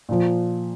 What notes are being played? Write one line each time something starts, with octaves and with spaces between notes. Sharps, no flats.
A#2 F3